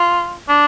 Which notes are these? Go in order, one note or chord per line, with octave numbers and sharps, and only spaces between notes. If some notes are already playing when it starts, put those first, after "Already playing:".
Already playing: F4
D4